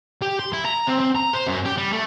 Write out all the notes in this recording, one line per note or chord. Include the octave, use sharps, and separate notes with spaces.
G4
C6
E4
A#5
C4
C4
A#5
C5
F#2
G4
G3
A3